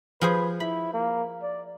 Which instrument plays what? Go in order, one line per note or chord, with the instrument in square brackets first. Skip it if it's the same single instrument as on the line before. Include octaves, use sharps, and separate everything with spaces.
[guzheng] F3 G#4 C5 [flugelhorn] B4
[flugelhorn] E4 [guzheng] B5
[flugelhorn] A#3
D5